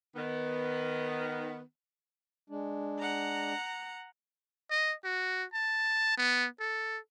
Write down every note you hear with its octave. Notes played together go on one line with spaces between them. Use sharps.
D#3 B3
G#3 D4
F#5 A#5
D#5
F#4
A5
B3
A4